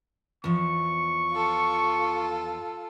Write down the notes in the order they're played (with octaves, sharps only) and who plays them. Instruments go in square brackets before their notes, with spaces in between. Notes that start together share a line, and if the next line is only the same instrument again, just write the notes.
[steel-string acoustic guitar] E2 F3 [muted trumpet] C#6
[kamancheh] F4 A4